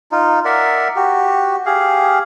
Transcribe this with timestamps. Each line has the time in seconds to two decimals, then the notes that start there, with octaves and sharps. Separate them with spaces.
0.12 D#4 F4
0.45 A#4 D5 E5 F#5
0.96 F#4 G4
1.66 G4 G#4 F5